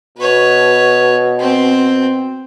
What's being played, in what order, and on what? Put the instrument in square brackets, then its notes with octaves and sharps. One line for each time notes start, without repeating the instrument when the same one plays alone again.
[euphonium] B2 [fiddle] B4 C#5
[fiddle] C4 C5